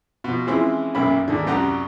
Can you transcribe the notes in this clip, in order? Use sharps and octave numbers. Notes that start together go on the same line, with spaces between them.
B2 F3
E3 F3 G#3 C4 C#4 E4
B1 F#2 A#3 C#4 E5 B5
D#2 G#2 D3
C2 F#2 G4 F#5 A#5